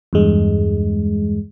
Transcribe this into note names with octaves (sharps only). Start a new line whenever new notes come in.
E2 G2 G#3